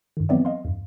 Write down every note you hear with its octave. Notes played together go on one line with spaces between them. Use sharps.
G2 D#3
E3 F#3 B3 C4 D5 E5
D#5 F5 C6
E2 G2